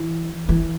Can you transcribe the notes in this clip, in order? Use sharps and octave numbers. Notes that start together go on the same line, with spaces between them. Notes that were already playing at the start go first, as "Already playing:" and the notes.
Already playing: E3
E3